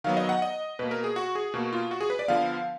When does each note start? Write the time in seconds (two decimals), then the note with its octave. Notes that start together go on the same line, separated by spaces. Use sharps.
0.04 D#3 F#3 B3 F5
0.17 D#5
0.29 F#5
0.42 D#5
0.79 B2 A#3 B4
0.91 A#4
1.04 G#4
1.16 F#4
1.35 G#4
1.54 B2 A#3 F#4
1.73 F4
1.91 F#4
2.01 G#4
2.10 B4
2.19 D5
2.28 D3 F3 B3 F5